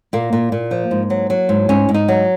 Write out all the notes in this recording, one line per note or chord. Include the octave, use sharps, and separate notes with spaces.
A#2 A#3
A#2
A#2
F3
G#2
F#3
F#3
G#2
G#2 C#4
G#2
D#4
F#3